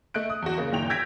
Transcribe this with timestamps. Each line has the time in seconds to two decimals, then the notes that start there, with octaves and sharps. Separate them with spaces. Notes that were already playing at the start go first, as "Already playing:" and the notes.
0.14 A3 D#5 F#6 D7
0.30 D#6
0.42 E2 F#4
0.57 C#3 A#3
0.72 F#1 A#2 D#3 G5 F7
0.90 E6 G6 G#6 A#6 B6 D7